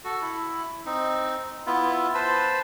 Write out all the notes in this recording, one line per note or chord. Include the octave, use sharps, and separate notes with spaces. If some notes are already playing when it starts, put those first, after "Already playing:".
F#4 A4
E4
C4 D#4
B3 E4 F4
B4 C5 A5 B5